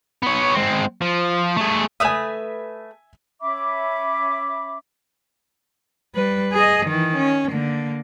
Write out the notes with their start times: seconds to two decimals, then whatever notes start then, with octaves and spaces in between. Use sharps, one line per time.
0.23 B3 C#5
0.55 G#3 C4
1.01 F3
1.57 A3 G#4
2.00 A3 B4 E5 G#5 D#6
3.41 C#4 E5 B5 D6
6.15 G3 B4
6.53 G#4 D#5
6.86 D#3 E3
7.17 C#4
7.50 D3 A#3